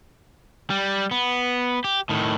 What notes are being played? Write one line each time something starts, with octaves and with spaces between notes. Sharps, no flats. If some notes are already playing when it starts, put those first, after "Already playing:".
G3
B3
G4
A2 D#3